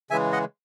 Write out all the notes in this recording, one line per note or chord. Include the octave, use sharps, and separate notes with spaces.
C#3 E3 G#3 E5 G#5
D#5 F#5